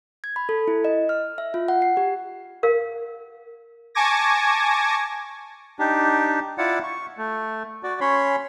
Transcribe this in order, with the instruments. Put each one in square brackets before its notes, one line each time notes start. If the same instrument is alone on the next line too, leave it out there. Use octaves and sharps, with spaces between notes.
[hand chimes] G#6
B5
A4
E4
D#5
F6
E5
F4
F#5
C7
G4
[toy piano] A#4 F5
[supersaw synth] G#5 A5 C#6 D6 G#6 A#6
[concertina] D4 D#4 G4
E4 F4 D5 F#5
C#6
A3
F#4 D5
C#4 C#5 B5 C6